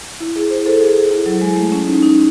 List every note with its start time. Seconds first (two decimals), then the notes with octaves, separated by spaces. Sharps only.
0.20 E4
0.36 G#4
0.51 C5
0.66 A4
0.81 G#4
0.97 G#4
1.11 E4
1.26 F#3
1.41 G#3
1.56 A3
1.72 C#4
1.87 D#4
2.03 D#4